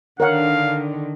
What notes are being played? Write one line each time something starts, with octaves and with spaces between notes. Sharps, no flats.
D3 D#3 A#4 C#5 F5 F#5